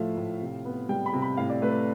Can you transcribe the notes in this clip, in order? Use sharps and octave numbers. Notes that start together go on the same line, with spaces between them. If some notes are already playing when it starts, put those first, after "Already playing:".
Already playing: A2 F3 A3 E5 F5
A2
C3
B3
G3 G5
B5
C3
B5
A2 F5
D5
A3 B4